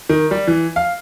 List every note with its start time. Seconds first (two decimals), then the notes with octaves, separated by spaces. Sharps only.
0.09 D#3
0.31 G3
0.47 E3
0.76 F5